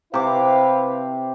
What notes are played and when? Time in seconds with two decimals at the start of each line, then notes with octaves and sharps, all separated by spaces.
0.14 C3 E4 B4 F5 D6